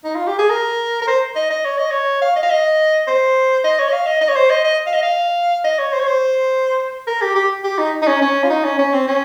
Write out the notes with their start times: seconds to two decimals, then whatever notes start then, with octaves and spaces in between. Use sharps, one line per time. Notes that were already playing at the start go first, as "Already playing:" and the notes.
0.04 D#4
0.15 F4
0.27 G4
0.38 G#4
0.50 A#4
1.02 A#4
1.07 C5
1.36 D#5
1.50 D#5
1.64 C#5
1.78 D#5
1.90 C#5
2.22 F5
2.36 D#5
2.43 F5
2.50 D#5
3.07 C5
3.64 D#5
3.79 C#5
3.88 D#5
3.93 F5
4.07 D#5
4.21 D#5
4.28 C#5
4.35 C5
4.50 D#5
4.64 D#5
4.86 F5
4.94 D#5
5.02 F5
5.64 D#5
5.78 C#5
5.92 C5
6.00 C#5
6.07 C5
7.07 A#4
7.21 G4
7.35 G4
7.64 G4
7.78 D#4
8.02 D#4
8.07 C#4
8.21 C#4
8.44 F4
8.50 D#4
8.64 C#4
8.78 C#4
8.93 C4
9.07 C#4